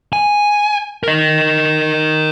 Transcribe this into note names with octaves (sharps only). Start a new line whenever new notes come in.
G#5
A#4 D#5